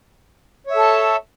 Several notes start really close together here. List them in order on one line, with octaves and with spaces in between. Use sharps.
C#5 E5 A4 A5